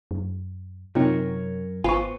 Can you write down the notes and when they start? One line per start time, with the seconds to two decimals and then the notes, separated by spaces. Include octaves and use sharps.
0.11 F#2
0.95 F#2 C3 C4 D#4 F4 A#4 C#5
1.84 G#1 B3 F4 B4 C5 G#5 C#6